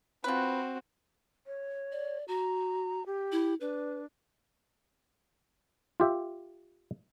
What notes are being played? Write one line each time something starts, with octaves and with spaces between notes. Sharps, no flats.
F3 C4 F#4 B4
C#5
D5
F#4 A#5
G4
E4
D4 B4
F4 G4 E5